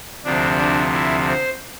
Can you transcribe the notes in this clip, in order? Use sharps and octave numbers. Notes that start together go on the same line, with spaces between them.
D2 C3 F3 D4
D4
E4
C5